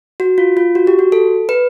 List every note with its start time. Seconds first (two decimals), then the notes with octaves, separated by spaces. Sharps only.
0.20 F#4
0.38 F4
0.57 F4
0.75 F#4
0.87 G4
0.99 F#4
1.12 A4
1.49 B4